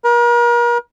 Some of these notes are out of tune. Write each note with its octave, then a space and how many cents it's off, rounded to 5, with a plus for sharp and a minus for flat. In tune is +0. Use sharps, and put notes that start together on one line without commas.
A#4 +40